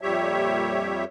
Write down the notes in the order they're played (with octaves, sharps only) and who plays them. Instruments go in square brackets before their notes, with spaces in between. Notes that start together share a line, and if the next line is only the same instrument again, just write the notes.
[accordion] F2 A#2 G3 G4 C#5 E5